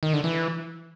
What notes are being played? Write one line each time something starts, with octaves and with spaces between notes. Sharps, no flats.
D#3
D3
E3